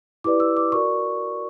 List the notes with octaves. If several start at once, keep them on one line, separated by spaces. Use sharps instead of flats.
E4 G4 B4 D5 D6
E6
D6
F#4 A#4 D5 C#6